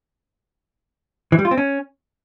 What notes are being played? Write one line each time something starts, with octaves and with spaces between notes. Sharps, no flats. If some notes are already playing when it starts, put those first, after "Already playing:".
E3
G3
F4
C4
C#4